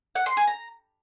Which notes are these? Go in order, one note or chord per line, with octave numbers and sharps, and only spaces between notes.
F#5
C6
G#4
A#5